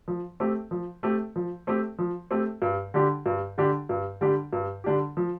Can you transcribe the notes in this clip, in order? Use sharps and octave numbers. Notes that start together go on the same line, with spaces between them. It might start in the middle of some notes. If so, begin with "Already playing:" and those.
F3
A3 C4 G4
F3
A3 C4 G4
F3
A3 C4 G4
F3
A3 C4 G4
G2
D3 G3 D4 G4
G2
D3 G3 D4 G4
G2
D3 G3 D4 G4
G2
D3 G3 D4 G4
F3